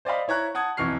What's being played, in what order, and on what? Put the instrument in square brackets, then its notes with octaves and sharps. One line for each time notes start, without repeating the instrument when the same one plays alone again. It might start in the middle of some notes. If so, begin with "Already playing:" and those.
[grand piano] C5 D5 D#5 F5 B5
E4 C#5 A#5 F#6
F#5 A5 D#6 G#6
B1 F2 E3 C#6 F6 C7